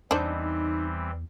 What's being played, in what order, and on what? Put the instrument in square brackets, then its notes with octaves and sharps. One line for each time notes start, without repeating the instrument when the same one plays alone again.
[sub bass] E2 [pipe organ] E3 G3 C4 [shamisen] D4 C5 [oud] D#4